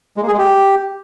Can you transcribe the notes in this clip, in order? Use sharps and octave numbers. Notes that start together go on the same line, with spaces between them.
G#3
A#3
G#4
G#3
G4